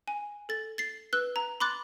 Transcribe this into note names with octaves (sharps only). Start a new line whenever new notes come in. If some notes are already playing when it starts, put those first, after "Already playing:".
G#5
A4 A6
A6 C7
B4 E6 F#6 G7
A#5
B5 C6 D6 F#6 A6